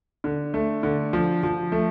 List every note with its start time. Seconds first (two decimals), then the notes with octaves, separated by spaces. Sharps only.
0.24 D3
0.54 A3
0.83 D3
1.13 F3
1.43 F3
1.72 A3